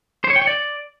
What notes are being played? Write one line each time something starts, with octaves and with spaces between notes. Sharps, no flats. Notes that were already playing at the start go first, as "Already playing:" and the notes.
C5
C#5
G5
C#5
D5